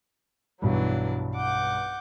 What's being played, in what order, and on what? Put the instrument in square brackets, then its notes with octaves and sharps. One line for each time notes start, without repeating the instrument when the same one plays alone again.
[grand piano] B1 G2 G3 [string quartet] E3 F#3 D4
[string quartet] F#5 D6 G6